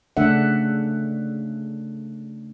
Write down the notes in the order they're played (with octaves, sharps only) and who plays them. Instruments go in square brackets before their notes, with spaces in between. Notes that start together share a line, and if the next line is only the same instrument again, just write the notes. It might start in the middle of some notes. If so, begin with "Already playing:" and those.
[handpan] C#3 A3 D4 E5 F#5